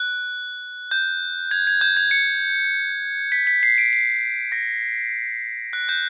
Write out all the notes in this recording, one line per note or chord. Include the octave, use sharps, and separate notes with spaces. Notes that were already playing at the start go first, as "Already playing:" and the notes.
Already playing: F#6
G6
G#6
G#6
G6
G#6
C#7
B6
B6
C7
D7
C7
A#6
F#6
G6